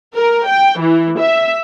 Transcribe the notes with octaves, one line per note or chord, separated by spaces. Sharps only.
A#4
G5
E3
E5